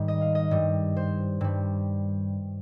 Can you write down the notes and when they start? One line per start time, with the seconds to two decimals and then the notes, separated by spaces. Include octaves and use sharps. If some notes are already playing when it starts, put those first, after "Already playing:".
Already playing: G#2 D#3 G3
0.08 D#5
0.21 F5
0.35 D#5
0.51 G2 G3
0.97 C5
1.41 G2 G3